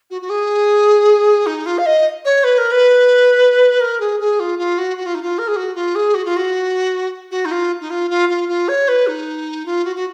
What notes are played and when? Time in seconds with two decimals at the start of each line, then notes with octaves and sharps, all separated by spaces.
0.11 F#4
0.22 F#4
0.30 G#4
1.46 D#4
1.66 F4
1.78 F5
1.86 D#5
2.25 C#5
2.44 B4
2.58 A#4
2.71 B4
3.80 A#4
4.00 G#4
4.20 G#4
4.40 F4
4.59 F4
4.78 F#4
4.97 F#4
5.06 F4
5.15 D#4
5.22 F4
5.38 A#4
5.48 G#4
5.56 F#4
5.75 F4
5.95 G#4
6.14 F#4
6.25 F4
6.36 F#4
7.31 F#4
7.45 D#4
7.51 F4
7.81 D#4
7.90 F4
8.10 F4
8.29 F4
8.49 F4
8.68 C#5
8.88 B4
9.07 D#4
9.66 F4
9.85 F#4
9.96 F#4